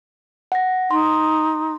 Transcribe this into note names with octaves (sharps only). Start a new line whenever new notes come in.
F#5 A#6
D#4 C6